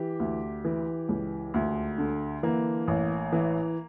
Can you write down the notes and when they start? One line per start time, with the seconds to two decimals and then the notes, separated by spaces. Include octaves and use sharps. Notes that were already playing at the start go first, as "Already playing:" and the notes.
Already playing: E3 G4
0.20 D2
0.65 E3
1.09 C#2
1.54 D2
1.98 D3
2.43 E3 A#3
2.88 A1
3.33 E3